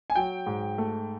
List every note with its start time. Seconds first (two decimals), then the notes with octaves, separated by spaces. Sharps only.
0.10 G#5
0.15 F#3 G5
0.46 G#2
0.78 A3